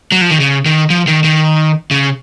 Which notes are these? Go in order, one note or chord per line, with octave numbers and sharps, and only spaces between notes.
F#3
F3
D#3
C#3
D#3
F3
D#3
D#3
C#3